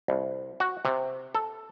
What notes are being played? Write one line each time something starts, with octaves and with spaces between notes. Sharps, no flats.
C2
F#4
C3
A4